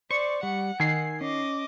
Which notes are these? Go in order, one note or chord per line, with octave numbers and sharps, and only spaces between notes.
C5 D5 C#6
G3 F#5
D#3 G#5 E6 C7
C#4 D#5 D6